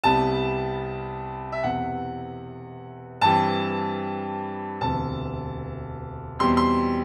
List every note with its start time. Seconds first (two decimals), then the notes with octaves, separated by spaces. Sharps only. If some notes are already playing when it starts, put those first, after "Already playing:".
0.04 C2 C3 G3 B3 A5
1.52 E5
1.63 E1 E2 C3 F#5
3.21 G2 E3 G3 C4 A5
4.80 E1 D2 C3 E3 A5
6.39 E2 B2 G3 C4 C6
6.57 C6